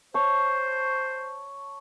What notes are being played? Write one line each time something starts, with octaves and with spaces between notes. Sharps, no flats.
C5 C#5 A5